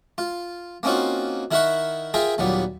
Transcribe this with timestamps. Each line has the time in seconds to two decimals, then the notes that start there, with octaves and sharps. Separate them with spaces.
0.18 F4
0.83 A#3 C4 C#4 D#4 F4 F#4
1.51 D#3 E4 A#4 E5 F#5 C#6
2.14 F4 G#4 A#4 E5 F5 G5
2.38 D#2 A#2 F#3 G3 B3